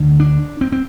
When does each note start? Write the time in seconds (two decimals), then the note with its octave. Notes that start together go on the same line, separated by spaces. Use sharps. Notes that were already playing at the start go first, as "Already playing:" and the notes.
Already playing: D2 D3
0.20 D4
0.61 C4
0.72 C4